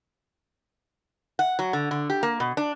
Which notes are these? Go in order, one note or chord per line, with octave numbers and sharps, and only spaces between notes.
F#5
F#3
D3
D3
G4
A#3
B2
D4